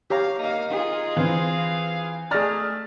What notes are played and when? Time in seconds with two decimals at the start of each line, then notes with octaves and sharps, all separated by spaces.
0.10 G4 C#5 F5 A#5
0.39 A#3 D#4 F5
0.71 F4 G#4
1.17 E3 C4 F5
2.31 A3 G#4 D5 A#5 F6 A6